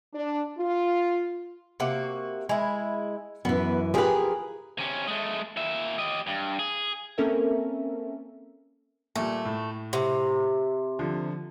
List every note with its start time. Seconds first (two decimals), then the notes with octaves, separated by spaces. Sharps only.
0.14 D4
0.58 F4
1.80 C3 A#3 F#4
2.49 G#3 E4
3.45 F#2 E3 B3 B4
3.94 F3 G4 G#4 A#4 B4
4.79 C3 C#4
5.07 G#3 A3
5.57 A#2 E5
5.98 G4 D#5
6.27 G2
6.59 G#4
7.18 A#3 C4 C#4 A4 A#4 E5
9.16 A#2 G3 A3
9.45 A2
9.93 C3
10.99 D3 F3